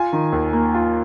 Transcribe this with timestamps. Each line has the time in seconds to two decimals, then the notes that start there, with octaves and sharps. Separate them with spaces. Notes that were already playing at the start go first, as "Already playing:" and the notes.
Already playing: F4 G#5
0.13 D#3
0.33 D#2
0.53 A#3
0.75 F4